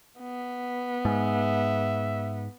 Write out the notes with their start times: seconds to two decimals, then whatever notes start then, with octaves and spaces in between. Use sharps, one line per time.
0.20 B3
1.05 G#2 E5